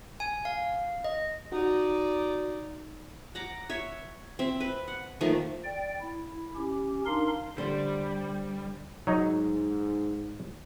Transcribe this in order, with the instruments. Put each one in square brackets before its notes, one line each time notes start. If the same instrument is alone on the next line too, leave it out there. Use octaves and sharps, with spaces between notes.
[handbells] G#5
F5
D#5
[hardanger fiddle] D#4 D5 [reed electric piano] F#4
[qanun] F#5 A#5 D6
C#5 E5
C4 E5
B4
F#5
D#3 F3 A3 A#3
[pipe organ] D5 G5
E4
C#4 G4
D4 D#4 A#4 F5 C6
[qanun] D3 [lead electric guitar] G3 [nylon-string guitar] C5
[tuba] G#2 [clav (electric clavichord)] F#3 D#4